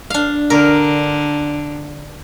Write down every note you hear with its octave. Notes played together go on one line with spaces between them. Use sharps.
D4 F5
D3 A#4